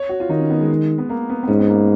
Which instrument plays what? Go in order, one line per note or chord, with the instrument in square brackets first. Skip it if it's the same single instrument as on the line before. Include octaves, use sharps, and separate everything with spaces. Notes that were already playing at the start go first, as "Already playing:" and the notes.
Already playing: [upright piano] C#5
F#4
F4
[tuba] D#3 [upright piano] D#4
[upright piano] C#4
B3
G#3
B3
A#3
B3
B3
[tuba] G#2 [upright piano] C#4
[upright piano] B3
A#3